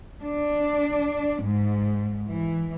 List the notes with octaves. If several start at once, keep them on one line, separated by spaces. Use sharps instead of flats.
D4
G#2
E3